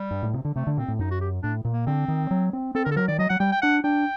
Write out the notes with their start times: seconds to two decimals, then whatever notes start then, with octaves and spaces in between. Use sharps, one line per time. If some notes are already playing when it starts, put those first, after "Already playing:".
Already playing: G3
0.11 G2
0.23 A2
0.34 C3
0.45 D3
0.55 C3 A3
0.67 D3
0.77 A#2 C4
0.88 A2
0.99 F#2 D#4
1.11 F#4
1.21 G4
1.43 A2 D4
1.65 A#2
1.73 A#3
1.86 D3 C4
2.08 D#3
2.31 F#3
2.53 C4
2.75 C4 A4
2.85 D3 A#4
2.91 A4
2.96 F#3 A#4
3.08 D#3 D5
3.18 F#3 D#5
3.29 F#3 F#5
3.40 G3 G5
3.52 G5
3.62 D4 F#5
3.84 D4 G5